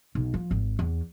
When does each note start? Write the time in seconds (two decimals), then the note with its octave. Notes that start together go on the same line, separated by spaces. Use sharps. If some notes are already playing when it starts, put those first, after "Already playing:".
0.15 B1
0.34 F3
0.51 G#1
0.79 E2